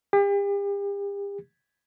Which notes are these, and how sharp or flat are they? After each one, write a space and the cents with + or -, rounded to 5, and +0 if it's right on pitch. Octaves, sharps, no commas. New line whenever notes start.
G4 +40